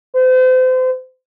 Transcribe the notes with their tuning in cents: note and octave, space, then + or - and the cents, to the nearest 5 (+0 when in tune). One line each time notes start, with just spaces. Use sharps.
C5 -35